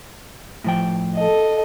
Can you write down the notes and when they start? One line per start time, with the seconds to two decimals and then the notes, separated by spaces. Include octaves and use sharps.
0.64 A2 F3 G5
1.16 A4 D#5